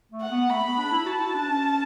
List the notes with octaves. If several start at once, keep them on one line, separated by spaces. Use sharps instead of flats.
A3
F#5
B3
A3 B5
B3
D4
E4
F#4 A5
E4
D4
C#4